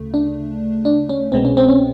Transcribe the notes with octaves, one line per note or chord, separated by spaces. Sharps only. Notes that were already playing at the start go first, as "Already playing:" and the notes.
Already playing: D2 C#3 A3
D4
D4
C#4
C2 B2 G#3 B3 C4
C#4
C4
C#4